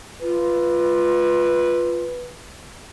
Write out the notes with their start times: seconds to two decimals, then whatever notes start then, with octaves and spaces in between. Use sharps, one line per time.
0.22 F4 B4